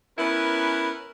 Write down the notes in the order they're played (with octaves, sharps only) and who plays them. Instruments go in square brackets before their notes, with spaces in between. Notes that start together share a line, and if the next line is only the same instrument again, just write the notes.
[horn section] B3 C#4 E4 A#4 B4